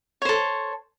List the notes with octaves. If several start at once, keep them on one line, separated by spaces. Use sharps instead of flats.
A4 C5 C#5